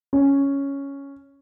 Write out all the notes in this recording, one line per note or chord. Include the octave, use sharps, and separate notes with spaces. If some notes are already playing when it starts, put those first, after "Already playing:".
C#4